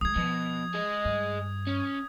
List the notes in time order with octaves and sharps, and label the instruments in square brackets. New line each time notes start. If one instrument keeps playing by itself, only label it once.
[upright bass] G#3 A#3 [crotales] D#6 G#6
[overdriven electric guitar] B2 [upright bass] F3
[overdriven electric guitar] G#4 D#5
[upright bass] G2
[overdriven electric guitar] C#4